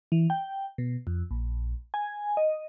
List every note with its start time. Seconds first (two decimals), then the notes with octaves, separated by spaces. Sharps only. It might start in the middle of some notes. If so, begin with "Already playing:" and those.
0.12 E3
0.30 G5
0.78 B2
1.07 F2
1.31 A#1
1.94 G#5
2.37 D#5